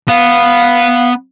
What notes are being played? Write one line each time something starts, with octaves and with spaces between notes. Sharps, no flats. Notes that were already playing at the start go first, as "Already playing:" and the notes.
B3 F5